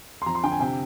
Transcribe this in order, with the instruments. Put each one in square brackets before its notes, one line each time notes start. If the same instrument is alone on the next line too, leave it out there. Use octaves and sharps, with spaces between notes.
[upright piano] C6
F2 A#5
C6
D3 G5
G#5
C3 G5